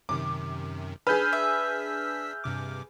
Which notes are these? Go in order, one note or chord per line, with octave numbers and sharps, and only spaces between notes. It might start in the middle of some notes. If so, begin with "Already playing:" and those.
F#2 C3 D#3 D6
D4 G#4 B4 E6 F6 G6 B6
E5
G2 C3 D6